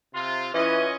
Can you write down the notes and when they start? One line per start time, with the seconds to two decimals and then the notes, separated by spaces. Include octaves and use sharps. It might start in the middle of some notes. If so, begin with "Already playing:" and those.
0.14 C3 F4
0.54 E3 C#4 F4 D#5